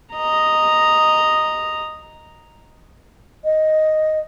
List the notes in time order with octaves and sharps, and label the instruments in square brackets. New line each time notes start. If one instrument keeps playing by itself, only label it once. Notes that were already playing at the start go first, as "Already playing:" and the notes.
[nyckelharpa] D#5 A#5
[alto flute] D#5